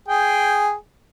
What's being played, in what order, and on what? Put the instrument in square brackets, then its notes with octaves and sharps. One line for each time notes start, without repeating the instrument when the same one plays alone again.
[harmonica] G#4 G5